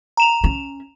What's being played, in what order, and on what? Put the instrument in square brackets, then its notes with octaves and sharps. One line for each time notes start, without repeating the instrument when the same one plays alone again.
[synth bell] A#5 E7 F7
[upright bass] C#4